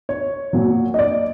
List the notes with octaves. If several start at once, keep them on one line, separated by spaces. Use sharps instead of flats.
C#5
A#2 F#3
D#5
D5